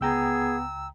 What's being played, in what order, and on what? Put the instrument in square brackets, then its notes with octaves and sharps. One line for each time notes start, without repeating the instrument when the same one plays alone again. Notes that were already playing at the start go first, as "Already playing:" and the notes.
[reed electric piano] C#2 G5 A#5 [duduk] B3 [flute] G#4 [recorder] E6